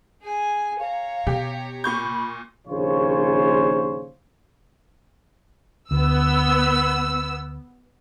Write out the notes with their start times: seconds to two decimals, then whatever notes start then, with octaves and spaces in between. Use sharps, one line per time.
0.23 G#4 G#5
0.80 C#5 F5 A#5
1.27 B2 G4
1.84 A#2 B5 C#6 G6
2.68 A#1 D#2 C#3 F4 C5 C#5
5.91 D2 B3 E6